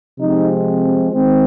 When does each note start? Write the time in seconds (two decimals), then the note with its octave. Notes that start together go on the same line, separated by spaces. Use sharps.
0.20 C3 F3 G#3 C4 D#4
1.12 D#3 G#3 C4